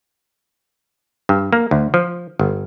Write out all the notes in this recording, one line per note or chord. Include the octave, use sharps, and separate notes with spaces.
G2
A#3
D2
F3
G1